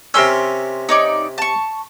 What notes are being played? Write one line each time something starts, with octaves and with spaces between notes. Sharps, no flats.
C3 C#4 A#4 C6 E6
D#4 C#5 D5
A5 C#6